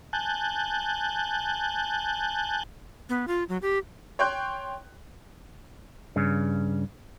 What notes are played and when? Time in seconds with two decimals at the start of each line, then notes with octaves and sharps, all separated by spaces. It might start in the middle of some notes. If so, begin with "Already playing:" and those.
0.13 G#5 A5 F#6 G6
3.09 B3
3.28 F4
3.49 F#3
3.62 G4
4.19 C#5 G5 C6 F#6 G6
6.16 G2 C#3